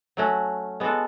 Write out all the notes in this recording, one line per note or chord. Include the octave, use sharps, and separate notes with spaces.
F#3 A3 C#4 F#4
G#3 B3 F#4 A4